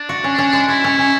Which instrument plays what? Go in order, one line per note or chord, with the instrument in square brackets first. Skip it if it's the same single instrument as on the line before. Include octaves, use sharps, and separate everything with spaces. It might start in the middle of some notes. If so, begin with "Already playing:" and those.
Already playing: [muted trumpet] D4
[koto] F#4
C#4
C#4
G#3
[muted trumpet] E4 [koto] F#4
[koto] C#4
C#4